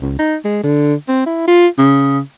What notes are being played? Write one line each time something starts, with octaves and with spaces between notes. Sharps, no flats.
C#2
D#4
G#3
D3
C4
E4
F4
C#3